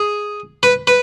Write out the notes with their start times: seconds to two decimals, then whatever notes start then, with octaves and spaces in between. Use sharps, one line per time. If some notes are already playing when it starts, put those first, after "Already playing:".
Already playing: G#4
0.63 B4
0.87 B4